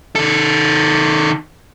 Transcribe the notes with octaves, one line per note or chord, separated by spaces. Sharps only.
D#3 A4